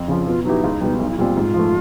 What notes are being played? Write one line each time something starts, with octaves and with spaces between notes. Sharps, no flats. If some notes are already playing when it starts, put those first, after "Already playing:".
Already playing: F2
C#3 F3
B2 F4
F#3 B3 D#4 E4 G4
C#2
B2 G3
B1 D#4
E4
A#2 G3 C4 F4
G#2
F3 A3